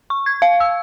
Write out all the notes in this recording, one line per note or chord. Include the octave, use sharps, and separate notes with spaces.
C#6
G#6
F5
E6